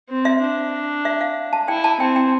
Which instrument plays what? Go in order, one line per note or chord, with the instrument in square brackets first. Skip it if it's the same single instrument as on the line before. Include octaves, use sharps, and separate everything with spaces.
[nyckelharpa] C4
[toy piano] E5
[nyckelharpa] D4
[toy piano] E5
F5
A5
[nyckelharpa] E4 [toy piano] G5
[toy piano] A5
[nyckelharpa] C4 [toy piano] G5
[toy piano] G5